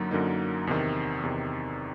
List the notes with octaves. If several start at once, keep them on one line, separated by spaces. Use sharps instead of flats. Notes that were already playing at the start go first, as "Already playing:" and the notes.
Already playing: F#2 D3 F#3 A#3 D#4
F#2 D3 F#3 A#3 D#4
E2 C3 D#3
E2 C3 D#3